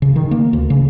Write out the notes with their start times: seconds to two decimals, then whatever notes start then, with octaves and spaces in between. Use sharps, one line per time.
0.02 C#3
0.16 D#3
0.31 A#3
0.53 D2
0.70 C#3